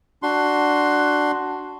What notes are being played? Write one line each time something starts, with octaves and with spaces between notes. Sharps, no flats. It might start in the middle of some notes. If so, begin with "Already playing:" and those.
D4 F#4 C6